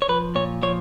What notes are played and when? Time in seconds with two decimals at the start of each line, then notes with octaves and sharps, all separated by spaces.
0.02 C#5
0.09 F3 B4
0.35 A#2 C#5
0.63 F3 C#5